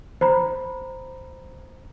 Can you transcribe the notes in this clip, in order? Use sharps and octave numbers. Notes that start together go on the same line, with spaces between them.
C5 A#5 B5